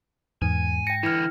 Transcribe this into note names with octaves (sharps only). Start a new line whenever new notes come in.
E2 G#2 G#5
G5 A#6 C#7
D3 E3 E4 F6